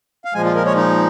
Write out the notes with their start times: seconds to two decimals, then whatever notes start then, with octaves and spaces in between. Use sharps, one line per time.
0.25 F5
0.34 A#2 F3 G#3 G#5
0.45 F4
0.55 A#4
0.66 C#5
0.76 D#4